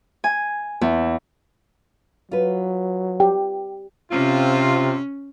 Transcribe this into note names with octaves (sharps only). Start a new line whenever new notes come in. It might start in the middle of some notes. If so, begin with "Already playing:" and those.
G#5
E2
F#3 F4 B4
G4 G5
C3 C4 C#4 F4